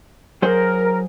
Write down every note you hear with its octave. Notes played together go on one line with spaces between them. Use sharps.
F#3 G#4 A#4 C5